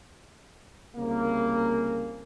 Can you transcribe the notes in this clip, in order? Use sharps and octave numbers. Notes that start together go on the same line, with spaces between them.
C2 C#3 A#3